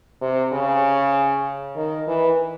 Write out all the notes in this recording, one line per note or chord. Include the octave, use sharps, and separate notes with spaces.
C3
C#3
D#3
E3